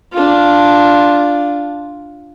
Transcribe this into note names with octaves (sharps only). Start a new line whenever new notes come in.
D4 F4